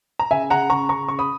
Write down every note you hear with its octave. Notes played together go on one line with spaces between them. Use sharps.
A#5
C#3 E5 G#5
C#3 F#5 A#5
C#3 A#5 C#6
C#3 A#5 C#6
C#3 C#6
B5 D#6